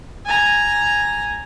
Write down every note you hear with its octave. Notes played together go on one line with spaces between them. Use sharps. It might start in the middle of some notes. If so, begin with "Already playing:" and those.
G#5 A#5